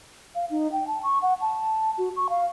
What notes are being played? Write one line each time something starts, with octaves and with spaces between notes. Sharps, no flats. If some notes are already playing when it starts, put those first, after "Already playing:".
F5
D#4
G5
A5
C#6
F#5
A5
F#4
C#6
F5